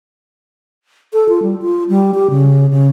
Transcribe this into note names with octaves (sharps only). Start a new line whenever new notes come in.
A4
F4
G3
F4
G3
G4
C#3
C#3